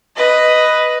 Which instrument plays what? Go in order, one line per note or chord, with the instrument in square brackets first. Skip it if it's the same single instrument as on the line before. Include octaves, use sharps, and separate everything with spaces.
[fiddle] B4 D#5